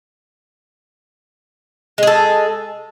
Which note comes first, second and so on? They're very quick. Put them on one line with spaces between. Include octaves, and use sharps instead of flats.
G#3 G#4 A4